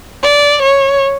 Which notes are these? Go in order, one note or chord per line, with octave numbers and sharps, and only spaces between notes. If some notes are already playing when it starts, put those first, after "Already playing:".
D5
C#5